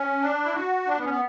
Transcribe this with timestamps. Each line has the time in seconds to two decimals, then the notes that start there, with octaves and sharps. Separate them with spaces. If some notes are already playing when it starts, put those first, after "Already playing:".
Already playing: C#4
0.21 D4
0.44 E4
0.55 F#4
0.87 D4
0.98 B3
1.05 C#4
1.09 B3